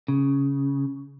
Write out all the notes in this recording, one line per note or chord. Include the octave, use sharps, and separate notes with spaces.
C#3